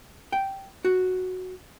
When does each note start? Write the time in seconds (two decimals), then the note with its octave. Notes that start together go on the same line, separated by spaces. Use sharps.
0.32 G5
0.85 F#4